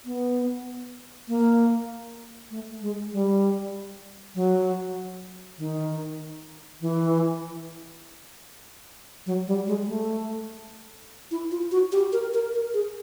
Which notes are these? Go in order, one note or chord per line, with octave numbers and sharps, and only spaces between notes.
B3
A#3
A3
G#3
G3
F#3
D#3
E3
F#3
G3
G#3
A3
E4
F4
F#4
G4
A#4
A#4
A#4
G#4